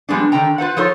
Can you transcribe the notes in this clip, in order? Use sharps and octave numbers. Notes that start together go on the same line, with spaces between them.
F3 G3 G#3 B3 D4
D3 D#3 D4 G5 A#5
F4 B4 C5 F#5
F3 D#4 F4 A4 C#5